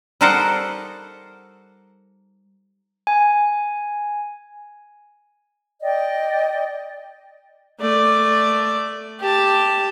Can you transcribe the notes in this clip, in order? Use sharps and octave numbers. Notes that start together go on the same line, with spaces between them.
G3 D#4 A4 A#4 C5 F#5
G#5
D5 D#5 G5
A3 D5
G4 A5